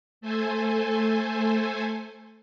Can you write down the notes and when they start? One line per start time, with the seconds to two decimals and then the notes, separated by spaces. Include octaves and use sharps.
0.21 A3 A4 C5 G#5